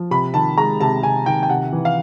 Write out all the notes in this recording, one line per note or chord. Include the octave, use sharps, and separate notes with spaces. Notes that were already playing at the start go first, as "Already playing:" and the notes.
Already playing: F3
C3 B5
D#3 A5
G#3 A#5
C3 A5
C3 G#5
D#3 G5
G5
C3 F#5
E3
F5